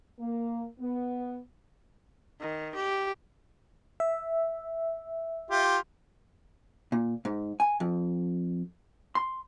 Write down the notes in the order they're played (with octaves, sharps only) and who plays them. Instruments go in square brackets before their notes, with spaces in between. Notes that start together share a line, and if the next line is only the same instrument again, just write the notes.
[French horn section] A#3
B3
[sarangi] D#3
G4
[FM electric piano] E5
[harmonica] F4 G4
[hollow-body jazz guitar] A#2
G#2
G#5
F2
C6